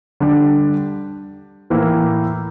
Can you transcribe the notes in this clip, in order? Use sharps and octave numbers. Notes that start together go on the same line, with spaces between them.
D3 G3 D4 G4
A2 E3 A#3 E4 A#4